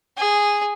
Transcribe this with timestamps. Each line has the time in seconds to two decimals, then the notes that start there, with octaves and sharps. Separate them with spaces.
0.18 G#4